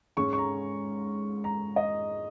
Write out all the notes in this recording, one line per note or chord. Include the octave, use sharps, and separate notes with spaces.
G#2 G#3 C#4 C#6
C#6
A#5
A#5
D#5